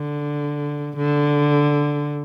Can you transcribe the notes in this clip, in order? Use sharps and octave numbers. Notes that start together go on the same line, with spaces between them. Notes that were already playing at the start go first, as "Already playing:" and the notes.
Already playing: D3
D3